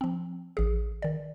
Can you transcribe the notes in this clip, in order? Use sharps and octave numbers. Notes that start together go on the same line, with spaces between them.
F3 C4
A1 G#4
D#3 D5